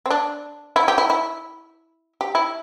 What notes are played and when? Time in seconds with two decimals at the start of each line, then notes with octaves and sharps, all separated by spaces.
0.06 C4
0.11 D4
0.76 E4
0.88 G4
0.98 E4
1.10 E4
2.21 G4
2.35 E4